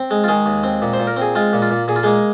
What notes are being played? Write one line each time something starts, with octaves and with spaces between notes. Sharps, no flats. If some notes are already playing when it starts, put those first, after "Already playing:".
Already playing: C4
G#3
F4
D#3 G#3 G#4
D#2
C4
A#2
C5
A#2
A#4
C4 G#4
G#3 F4
A#2
F4
A#2
A#2 G#4
F4
G#3 A#3 G#4